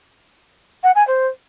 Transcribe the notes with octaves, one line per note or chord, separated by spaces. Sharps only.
F#5
G#5
C5